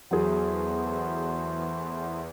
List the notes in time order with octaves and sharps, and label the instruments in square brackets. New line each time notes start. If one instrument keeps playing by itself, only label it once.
[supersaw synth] E2 [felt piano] F#3 G#4 [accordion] A3 B3 C5